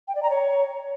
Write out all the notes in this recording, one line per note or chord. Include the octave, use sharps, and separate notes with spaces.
G5
D5
A#5
C#5